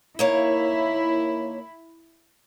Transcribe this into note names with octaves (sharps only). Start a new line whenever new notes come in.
D#2 A#3 E4 C#5